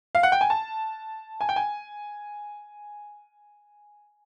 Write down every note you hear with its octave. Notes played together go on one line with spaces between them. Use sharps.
F5
F#5
G5
G#5
A5
G#5
G5
G#5